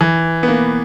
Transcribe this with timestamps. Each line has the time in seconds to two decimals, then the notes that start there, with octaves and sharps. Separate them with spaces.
0.01 E3
0.43 B3
0.48 A#3